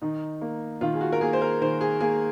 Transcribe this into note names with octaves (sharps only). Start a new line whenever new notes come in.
D#3 D#4
A#3
D#3 F4
G#4
F#4
A#4
A#3 G#4
C5
A#4
D#3 C5
G#4
A#3 G#4